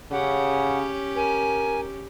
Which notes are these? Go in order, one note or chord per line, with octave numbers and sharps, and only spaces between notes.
C#3 C#4 G4 F#5
A#4 G#5